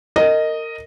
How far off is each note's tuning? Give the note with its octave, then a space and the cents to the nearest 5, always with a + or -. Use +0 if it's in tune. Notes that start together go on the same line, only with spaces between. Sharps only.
A#4 -25 D#5 +0